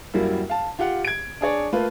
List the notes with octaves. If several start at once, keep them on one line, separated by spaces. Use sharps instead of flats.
F#2 F#3 G3 A#3 E4
F5 A5
F4 G4 F5 F#5
G#6 D7
D4 G#4 C#5 D5
A3 A#3 F4 B4